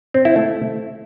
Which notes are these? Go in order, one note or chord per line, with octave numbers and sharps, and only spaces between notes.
C4
E4
A3